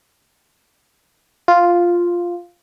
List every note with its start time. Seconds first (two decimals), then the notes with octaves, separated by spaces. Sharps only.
1.48 F4